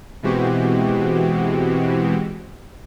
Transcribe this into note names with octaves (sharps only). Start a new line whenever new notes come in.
B2 E3 G#3 C4 F#4 G4